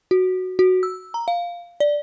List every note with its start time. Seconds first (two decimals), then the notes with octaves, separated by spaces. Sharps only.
0.11 F#4
0.59 F#4
0.83 E6
1.14 A#5
1.28 F5
1.80 D5